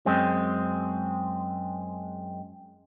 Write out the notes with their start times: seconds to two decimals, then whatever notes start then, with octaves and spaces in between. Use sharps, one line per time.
0.06 F#2 G#3 C4